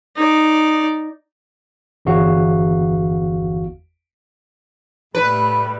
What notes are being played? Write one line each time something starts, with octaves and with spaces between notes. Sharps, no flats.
D#4 D5
G1 E2 F#4 F5
A2 G3 A3 B4 B5